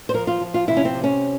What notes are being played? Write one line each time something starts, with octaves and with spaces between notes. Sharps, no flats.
C5
F3 A#4
F4
F3
F4
C3 E4
C#4
C4
C3
C#4